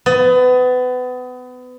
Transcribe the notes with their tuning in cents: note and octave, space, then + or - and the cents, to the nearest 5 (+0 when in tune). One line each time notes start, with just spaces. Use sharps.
B3 +30